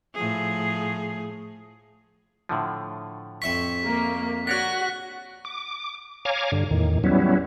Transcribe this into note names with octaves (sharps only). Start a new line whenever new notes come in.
A2 F3 G#4
A2 D3 F3
F2 E5 C#6 B6
A#3
D4 F#4 C#5 D5 F#5 F#6 A#6 B6
D6
C#5 F5 G#5 A#5 D6
G2 D3
E2 A2 D#3
F#3 G3 B3 C#4 E4